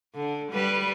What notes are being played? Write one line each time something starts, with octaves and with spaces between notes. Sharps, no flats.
D3
G3 B4